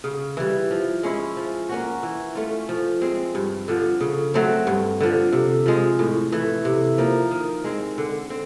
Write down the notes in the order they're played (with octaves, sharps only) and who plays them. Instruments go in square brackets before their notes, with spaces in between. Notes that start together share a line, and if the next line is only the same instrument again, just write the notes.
[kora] C#3
E3 G3
F3
G#3 C#4 E4
F3
A#3 C#4 F#4
E3
A3 C#4 F4
F3
G#3 C4
G2
D3 F3
C#3
F#3 A3 C4
G2
D3 F3
C3
F3 G#3
A2
E3 A3
C3
F3 A#3
D#3
G#3 C4
D3
C4